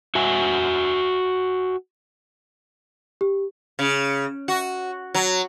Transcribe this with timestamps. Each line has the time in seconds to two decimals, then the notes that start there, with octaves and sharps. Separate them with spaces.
0.15 F#4 E5 G#5
3.21 G4
3.79 C#3
4.48 F#4
5.15 F#3